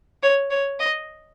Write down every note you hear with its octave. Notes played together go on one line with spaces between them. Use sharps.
C#5
C#5
D#5